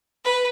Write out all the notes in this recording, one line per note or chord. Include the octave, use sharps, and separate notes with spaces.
B4